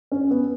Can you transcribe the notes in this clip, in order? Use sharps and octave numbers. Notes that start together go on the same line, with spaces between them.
C#4
B3